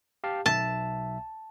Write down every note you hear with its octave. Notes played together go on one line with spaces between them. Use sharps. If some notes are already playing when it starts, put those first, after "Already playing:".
G4 F5 A5
B1 E5 A5